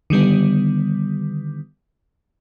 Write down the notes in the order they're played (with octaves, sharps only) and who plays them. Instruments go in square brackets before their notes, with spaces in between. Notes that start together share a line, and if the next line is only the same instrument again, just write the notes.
[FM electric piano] D3 D#3 G3 B3